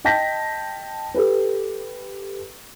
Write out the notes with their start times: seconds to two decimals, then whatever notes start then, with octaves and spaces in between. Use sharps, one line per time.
0.04 D#5 G5 A5 G6 A#6 B6
1.14 G4 A4 B4